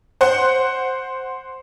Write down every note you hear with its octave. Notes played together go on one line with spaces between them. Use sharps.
C5 F#5